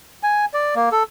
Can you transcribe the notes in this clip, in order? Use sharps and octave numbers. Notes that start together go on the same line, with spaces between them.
G#5
D5
A#3
A4